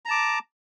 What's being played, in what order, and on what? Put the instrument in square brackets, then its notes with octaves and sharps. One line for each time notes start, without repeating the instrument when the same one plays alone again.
[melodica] A#5
A5
D6